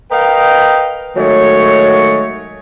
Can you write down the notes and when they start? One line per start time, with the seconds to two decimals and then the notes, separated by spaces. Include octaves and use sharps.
0.11 A#4 B4 D#5 F5 G5
1.16 D#3 F#3 G#3 A3 C#5